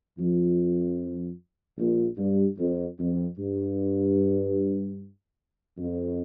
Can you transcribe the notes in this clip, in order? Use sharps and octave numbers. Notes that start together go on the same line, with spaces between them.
F2 F3
A#1 A#2
G2
F2
F2
G2
F2